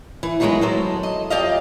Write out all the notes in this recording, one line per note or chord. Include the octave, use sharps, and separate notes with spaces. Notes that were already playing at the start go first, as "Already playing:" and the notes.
E3
D#3 E3 F#3 G#3 B3 G#4
F#3 A4 C5
D#5
F2 G4 D5 D#5 F5